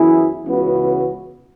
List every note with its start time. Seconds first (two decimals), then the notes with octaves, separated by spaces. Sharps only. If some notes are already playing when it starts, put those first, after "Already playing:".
Already playing: F#2 E3 B3 E4 G#4
0.45 C#2 C#3 E3 B3 F#4